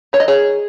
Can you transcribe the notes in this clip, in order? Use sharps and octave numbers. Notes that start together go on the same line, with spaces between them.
D#3 C#5
D#5
G#4 C#5